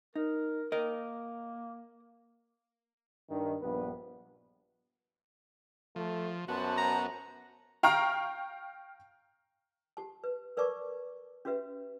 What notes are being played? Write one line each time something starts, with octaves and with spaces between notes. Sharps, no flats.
D#4 A#4
A#3 A#4 D#5
G2 D#3
A#1 G2 B3 B4
F3 A3
F#2 B3 F#4 C5 A5
A#5
F5 G5 A#5 C#6 F6
G4 A5
B4
A#4 B4 D5 A5 C#6 D6
C#4 F#4 G4 B4 E5